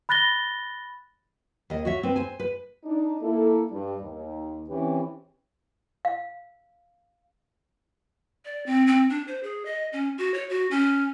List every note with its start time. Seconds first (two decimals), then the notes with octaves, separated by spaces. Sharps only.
0.09 B5 F#6 A6 A#6 G7
1.70 D#2 D#5
1.85 F#4 C#5 E5
2.03 C4 B4
2.16 C5 G#5
2.40 B4
2.84 D4 D#4
3.21 A#3 E4 A4
3.70 G2 G3
4.01 D#2
4.68 C#3 E3 C4 C#4 G4 B4
6.05 F5
8.45 D5
8.66 C4
8.87 C4
9.10 D4
9.28 C5
9.43 G#4
9.65 D#5
9.93 C#4
10.18 F#4
10.34 C#5
10.50 F#4
10.71 C#4